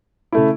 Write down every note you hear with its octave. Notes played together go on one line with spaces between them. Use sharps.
C#3 A3 E4